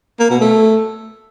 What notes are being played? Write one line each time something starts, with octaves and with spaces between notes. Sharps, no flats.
A#3
B2
A3